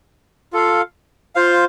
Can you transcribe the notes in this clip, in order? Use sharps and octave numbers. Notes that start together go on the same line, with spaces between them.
F4 A4 F5
F4 C5 F5